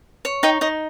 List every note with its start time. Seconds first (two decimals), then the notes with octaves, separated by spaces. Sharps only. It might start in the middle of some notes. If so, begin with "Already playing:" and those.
0.25 C#5
0.43 D#4 D#5 G5
0.61 D#4 D#5